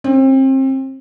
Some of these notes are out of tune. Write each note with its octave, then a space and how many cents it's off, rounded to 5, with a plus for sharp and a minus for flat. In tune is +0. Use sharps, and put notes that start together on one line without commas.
C4 +30 C5 +35